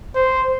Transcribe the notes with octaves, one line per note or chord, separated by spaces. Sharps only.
C5